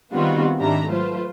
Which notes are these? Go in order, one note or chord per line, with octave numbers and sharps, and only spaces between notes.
D#3 G3 B3 C4 F4 F#4
G#1 D#3 G3 D4 E5 A#5
F#3 A3 F4 B4 C5